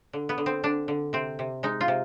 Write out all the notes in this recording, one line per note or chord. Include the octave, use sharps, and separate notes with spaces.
D3
B3
D3
C4
D3 D4
D3
C3 C4
C3
G#3 D#4
F4
C3